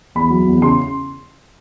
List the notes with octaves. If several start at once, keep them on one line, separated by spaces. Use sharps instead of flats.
E2 B5
F#3
E2
C#3 C6